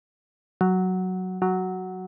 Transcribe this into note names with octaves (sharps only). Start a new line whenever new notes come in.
F#3
F#3